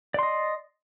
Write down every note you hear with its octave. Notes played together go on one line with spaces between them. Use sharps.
D5 D#5 C6